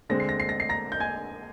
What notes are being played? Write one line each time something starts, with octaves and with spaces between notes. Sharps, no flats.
D3 G#3 C4 A#6
C7
A#6
C7
A#6
C7
A#5 A#6
G6
G#5 G#6